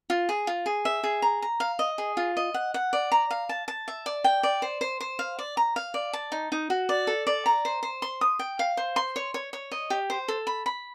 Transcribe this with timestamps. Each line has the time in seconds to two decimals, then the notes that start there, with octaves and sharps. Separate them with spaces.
0.10 F4
0.29 G#4
0.47 F4
0.66 G#4
0.85 E5
1.03 G#4
1.22 A#5
1.42 A#5
1.60 F5
1.79 D#5
1.98 G#4
2.17 F4
2.37 D#5
2.54 F#5
2.74 F#5
2.93 D5
3.12 A#5
3.31 F5
3.49 A5
3.68 A5
3.88 E5
4.06 D5
4.24 G5
4.43 D5
4.62 C5
4.81 C5
5.01 C5
5.19 F5
5.39 D5
5.57 A#5
5.76 F5
5.94 D5
6.13 A5
6.32 D#4
6.52 D#4
6.70 F#4
6.89 D5
7.07 A4
7.27 D5
7.46 A#5
7.65 C5
7.83 C5
8.02 C6
8.21 D#6
8.39 G5
8.59 F5
8.77 C5
8.96 C6
9.16 C#5
9.34 C#5
9.53 C#5
9.71 D#5
9.90 G4
10.10 C5
10.28 A4
10.47 B5
10.66 B5